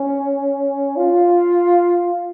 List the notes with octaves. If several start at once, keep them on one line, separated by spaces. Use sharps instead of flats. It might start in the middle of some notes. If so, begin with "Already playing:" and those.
Already playing: C#4
F4